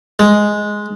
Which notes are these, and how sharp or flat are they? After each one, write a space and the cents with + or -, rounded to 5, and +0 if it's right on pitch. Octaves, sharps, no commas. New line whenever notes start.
G#3 +5